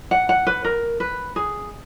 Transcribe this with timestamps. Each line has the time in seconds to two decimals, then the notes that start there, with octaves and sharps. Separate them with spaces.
0.11 F#5
0.29 F#5
0.47 B4
0.65 A#4
1.00 B4
1.36 G#4